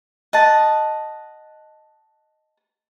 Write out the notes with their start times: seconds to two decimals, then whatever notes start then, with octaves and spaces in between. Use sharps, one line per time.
0.33 D#5 F#5 A5